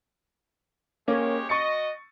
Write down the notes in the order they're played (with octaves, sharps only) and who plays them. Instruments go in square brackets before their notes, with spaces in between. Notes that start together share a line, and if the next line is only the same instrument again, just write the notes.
[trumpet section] G#3 G4 C#5 [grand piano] A#3 C#4
[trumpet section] F#4 D#5 [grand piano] C#6 A6 C#7